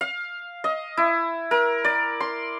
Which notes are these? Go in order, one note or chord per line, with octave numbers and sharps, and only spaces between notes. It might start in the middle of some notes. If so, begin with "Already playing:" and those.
F5
D#5
E4
A#4
D5
C6